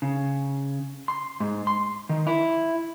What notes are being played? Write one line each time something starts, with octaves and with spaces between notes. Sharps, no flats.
C#3
C6
G#2
C6
D#3
E4